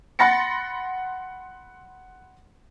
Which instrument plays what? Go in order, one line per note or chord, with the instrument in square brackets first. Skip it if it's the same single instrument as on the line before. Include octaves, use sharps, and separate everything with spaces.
[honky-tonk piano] F#5 B5 C6 A6 A#6 C#7